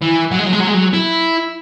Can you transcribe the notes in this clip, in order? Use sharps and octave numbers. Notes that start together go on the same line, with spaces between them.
E3
F#3
G#3
F#3
G#3
F#3
G#3
F#3
E4